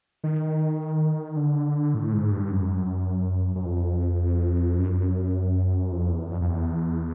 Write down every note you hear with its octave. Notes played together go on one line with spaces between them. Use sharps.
D#3
D3
A2
G#2
G2
F#2
F#2
F2
F#2
F2
E2
F2
F2
E2